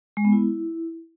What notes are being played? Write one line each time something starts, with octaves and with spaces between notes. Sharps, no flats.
G#3
B3
E4